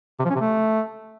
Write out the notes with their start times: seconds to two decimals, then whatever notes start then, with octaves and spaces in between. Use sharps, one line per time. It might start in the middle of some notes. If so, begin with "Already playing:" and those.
0.19 C3
0.24 F3
0.30 C#4
0.35 C3
0.40 A3